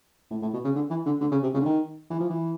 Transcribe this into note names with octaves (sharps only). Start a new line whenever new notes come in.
A2
A2
B2
C#3
D3
E3
D3
D3
C#3
C3
C#3
D3
D#3
E3
F3
E3